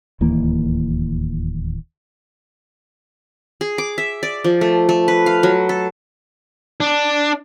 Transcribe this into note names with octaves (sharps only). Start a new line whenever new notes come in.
D1 D#2 E3 A#3
G#4
D6
E5
D5
F3
A3
A3
B4
F5
F#3
A4
D4